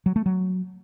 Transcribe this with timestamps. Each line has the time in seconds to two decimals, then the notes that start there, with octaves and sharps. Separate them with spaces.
0.06 F#3
0.16 A3
0.26 F#3